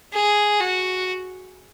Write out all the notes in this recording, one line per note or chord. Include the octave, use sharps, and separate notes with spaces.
G#4
F#4